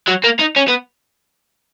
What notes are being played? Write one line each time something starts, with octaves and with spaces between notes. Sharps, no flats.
F#3
A#3
D#4
C#4
B3